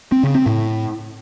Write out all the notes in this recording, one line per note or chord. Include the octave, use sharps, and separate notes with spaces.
C4
C#3
C4
A2